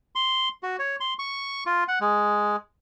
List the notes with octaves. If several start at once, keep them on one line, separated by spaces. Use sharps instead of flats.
C6
F#4
C#5
C6
C#6
F4
F#5
G#3